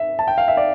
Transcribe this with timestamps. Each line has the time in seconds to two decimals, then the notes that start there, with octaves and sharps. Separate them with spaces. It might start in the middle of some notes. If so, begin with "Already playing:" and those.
Already playing: E5
0.19 A5
0.28 G5
0.38 F5
0.48 E5
0.57 D5